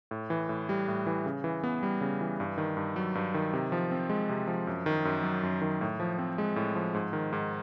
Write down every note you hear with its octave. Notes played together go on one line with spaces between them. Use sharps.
A2
E3
A2
G3
A2
E3
C#3
E3
B3
G3
C#3
E3
G2
D#3
G2
F#3
G2
D#3
C3
F3
C4
G#3
C3
F3
F#2
D#3
F#2
F#3
F#2
D#3
A2
F3
C4
G#3
A2
F3
G#2
D#3
G#2